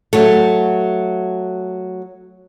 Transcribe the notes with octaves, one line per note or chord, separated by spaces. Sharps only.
F#3 A3